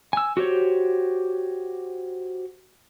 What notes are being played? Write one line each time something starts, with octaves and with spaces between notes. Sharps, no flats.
G#5 E6
F#4 G4 C5 C#5